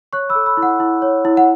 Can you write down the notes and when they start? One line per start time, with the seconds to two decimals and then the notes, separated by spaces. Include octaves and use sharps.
0.13 C#5 C#6 F#6
0.29 B5 E6
0.35 A4
0.46 B5 E6
0.57 E4
0.63 F#5
0.80 E4
1.02 C#5
1.25 E4
1.37 F#5